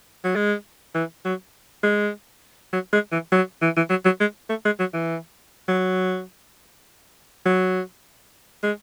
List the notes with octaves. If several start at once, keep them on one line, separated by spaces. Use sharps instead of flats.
F#3
G#3
E3
F#3
G#3
F#3
G#3
E3
F#3
E3
E3
F#3
F#3
G#3
A3
G#3
F#3
E3
F#3
F#3
G#3